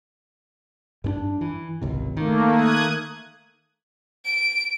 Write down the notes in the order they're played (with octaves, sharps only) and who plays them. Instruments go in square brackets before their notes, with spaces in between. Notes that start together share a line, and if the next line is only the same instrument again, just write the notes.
[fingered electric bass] G2 C#4 D4
E3
G#1 C#2 C3
[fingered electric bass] D#3 [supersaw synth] A3 A#3
[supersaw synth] D#6 F#6 G#6
[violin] D7